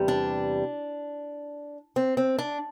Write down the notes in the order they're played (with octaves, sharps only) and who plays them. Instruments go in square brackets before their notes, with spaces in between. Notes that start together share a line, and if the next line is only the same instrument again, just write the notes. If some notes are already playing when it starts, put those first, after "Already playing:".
Already playing: [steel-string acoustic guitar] E2 C3 G3
D4
C4
C4
D4